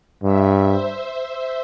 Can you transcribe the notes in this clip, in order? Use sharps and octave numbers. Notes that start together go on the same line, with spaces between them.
G2 E5
C5